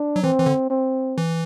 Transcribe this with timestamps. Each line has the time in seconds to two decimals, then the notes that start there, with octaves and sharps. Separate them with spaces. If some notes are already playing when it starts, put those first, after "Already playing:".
Already playing: D4
0.16 F#3
0.23 E3 C4
0.39 E3
0.46 D3
0.70 C4
1.18 E3